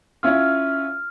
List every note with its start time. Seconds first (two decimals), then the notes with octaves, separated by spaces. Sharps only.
0.23 C#4 E4 F4 F6